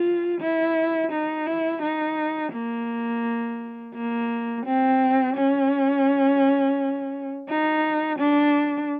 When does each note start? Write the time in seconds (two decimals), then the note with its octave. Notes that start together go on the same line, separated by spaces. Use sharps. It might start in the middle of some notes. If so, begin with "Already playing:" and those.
Already playing: F4
0.41 E4
1.12 D#4
1.47 E4
1.82 D#4
2.53 A#3
3.94 A#3
4.66 C4
5.36 C#4
7.49 D#4
8.19 D4